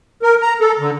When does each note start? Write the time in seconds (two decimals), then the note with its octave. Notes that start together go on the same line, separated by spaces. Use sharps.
0.23 A#4
0.42 A#5
0.61 A4
0.79 D3